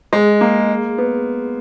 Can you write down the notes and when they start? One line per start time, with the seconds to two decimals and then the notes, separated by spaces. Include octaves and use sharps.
0.13 G#3
0.41 A#3
0.98 B3